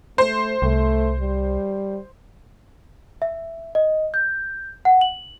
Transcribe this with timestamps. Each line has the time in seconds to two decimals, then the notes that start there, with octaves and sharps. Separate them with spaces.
0.18 A3 C5
0.62 C2 A3
1.20 G3
3.22 E5
3.75 D#5
4.14 G6
4.85 F#5
5.01 F#7